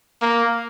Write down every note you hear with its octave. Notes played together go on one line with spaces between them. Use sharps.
A#3